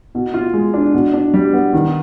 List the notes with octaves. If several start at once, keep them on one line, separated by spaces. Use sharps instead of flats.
B2
F4
G#3
D4
B2
D4
G3
B3
D#3